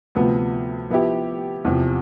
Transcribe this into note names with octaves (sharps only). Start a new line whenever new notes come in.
D2 C3 F3 B3
F3 B3 E4 G4
E2 C3 F3